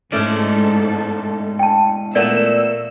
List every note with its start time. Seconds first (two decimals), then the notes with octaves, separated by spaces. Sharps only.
0.12 G#2 E3 G#3 A3 C#4 A4 D5
1.59 G5 A5
2.15 A#2 A3 B3 D5 E6